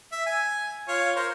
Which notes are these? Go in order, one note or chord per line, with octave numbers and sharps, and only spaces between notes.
E5
G#5
F4 C#5 F5
A#4 C5